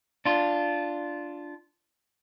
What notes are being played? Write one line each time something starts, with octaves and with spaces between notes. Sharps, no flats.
D4 F4